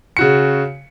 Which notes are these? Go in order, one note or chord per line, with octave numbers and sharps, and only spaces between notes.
C#3 F#4 C#7